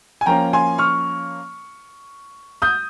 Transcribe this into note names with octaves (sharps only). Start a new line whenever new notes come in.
G#5
F3 A#3 C#4 G5 A#5
G#5 C6
C#6 F6
D#6 G6